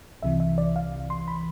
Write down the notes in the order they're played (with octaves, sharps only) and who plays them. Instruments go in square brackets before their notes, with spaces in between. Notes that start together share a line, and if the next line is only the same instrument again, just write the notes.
[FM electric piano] C2 C3 E3 E5
E5
D5
F5
C6
B5